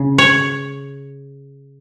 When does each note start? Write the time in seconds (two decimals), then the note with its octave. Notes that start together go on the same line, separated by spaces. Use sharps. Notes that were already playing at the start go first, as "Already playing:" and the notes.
Already playing: C#3
0.18 C#5